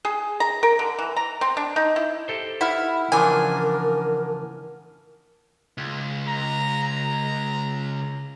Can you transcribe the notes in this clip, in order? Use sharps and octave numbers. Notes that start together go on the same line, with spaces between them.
G#4
A#5
A#4
D3
E3
A#5
C4
D4
D#4
E4
G4 A4 C5
E4 F#5 F6
C#3 E3 F3 D4 A#4 G#5
C#2
A#5
A#5